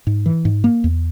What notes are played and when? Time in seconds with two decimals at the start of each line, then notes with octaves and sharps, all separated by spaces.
0.07 G#2
0.26 E3
0.45 G#2
0.64 A#3
0.84 E2